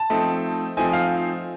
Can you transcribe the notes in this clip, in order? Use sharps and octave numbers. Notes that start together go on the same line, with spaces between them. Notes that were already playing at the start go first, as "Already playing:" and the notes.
Already playing: A5
F3 A3 C4 D#4
F3 A3 C4 D#4 G#5
F5